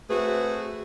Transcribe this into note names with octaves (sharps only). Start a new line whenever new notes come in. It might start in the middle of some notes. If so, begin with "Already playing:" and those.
A3 C4 F#4 G#4 B4